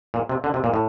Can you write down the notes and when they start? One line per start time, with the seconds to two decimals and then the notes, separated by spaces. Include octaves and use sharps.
0.14 A#2
0.29 C3
0.44 D3
0.54 C3
0.64 A#2
0.74 A2